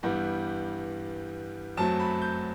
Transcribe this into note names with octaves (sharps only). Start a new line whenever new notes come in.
G2 E3 G3 B3 F#5
F#2 F#3 A3 C4 A5
B5
G6